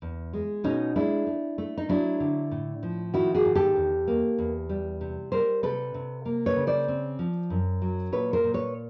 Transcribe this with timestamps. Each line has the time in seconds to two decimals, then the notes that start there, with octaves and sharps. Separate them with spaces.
0.02 E2
0.33 G#3
0.64 B2 C#4 D#4
0.96 G#3 D4 E4
1.27 A3
1.58 A3
1.78 D#4
1.89 F#3 D4 E4
2.20 D3
2.51 A2
2.83 F3
3.14 D#3 E4 F#4
3.35 F#4 G#4
3.45 G#2
3.55 G4 A4
3.76 E2
4.07 A#3
4.39 E2
4.69 G3
5.01 C3
5.32 G3 A#4 C5
5.63 C3 A4 B4
5.94 C3
6.25 A#3
6.46 B4 C#5
6.56 C#3
6.67 C5 D5
6.88 C4
7.19 F3
7.50 F#2
7.82 F#3
8.12 A#2 B4 C#5
8.33 A#4 C5
8.44 A#2
8.54 B4 C#5